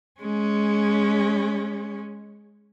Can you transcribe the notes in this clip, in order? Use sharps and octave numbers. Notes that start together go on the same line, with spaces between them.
G#3 C#4